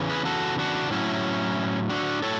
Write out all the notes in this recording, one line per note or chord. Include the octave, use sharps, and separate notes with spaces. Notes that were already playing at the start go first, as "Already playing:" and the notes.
Already playing: E2 C#3 E3
G#4 B4
F#4 A4
D4 F#4
A2 F#3 C#4 E4
D4 F#4
A2 F#3 A4 C#5